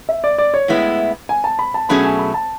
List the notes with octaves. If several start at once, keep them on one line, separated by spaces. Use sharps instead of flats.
E5
D5
D5
C#5
A2 G#3 B3 E4
G#5
A5
B5
A5
B2 F#3 A3 C#4 G#4 B5
G#5
B5
A5